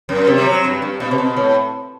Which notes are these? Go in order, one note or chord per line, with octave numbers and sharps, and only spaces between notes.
F#2
C3
G3
F#3
G2
G2
B2
C3
B2
A2